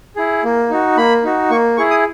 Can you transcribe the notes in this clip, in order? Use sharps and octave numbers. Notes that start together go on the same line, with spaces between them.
E4 G#4
A#3
D#4 F#4
A#3 B5
D#4 F#4
A#3 C#6
E4 G#4 C#6
D#6